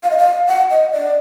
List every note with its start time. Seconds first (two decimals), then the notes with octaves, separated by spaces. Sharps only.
0.03 F5
0.10 D#5
0.17 F5
0.47 F#5
0.70 D#5
0.92 D5